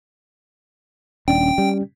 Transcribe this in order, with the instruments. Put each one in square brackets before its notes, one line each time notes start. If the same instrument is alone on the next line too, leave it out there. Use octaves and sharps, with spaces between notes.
[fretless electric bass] D#1 D4 [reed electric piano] C#4 [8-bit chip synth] G5
[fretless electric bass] G3